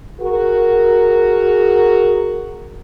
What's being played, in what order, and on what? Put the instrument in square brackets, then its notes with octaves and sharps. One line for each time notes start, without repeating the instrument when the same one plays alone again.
[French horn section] F#4 G#4 A#4